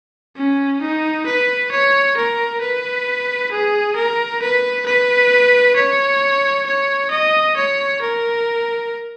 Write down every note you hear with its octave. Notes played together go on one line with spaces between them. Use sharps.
C#4
D#4
B4
C#5
A#4
B4
G#4
A#4
B4
B4
C#5
C#5
D#5
C#5
A#4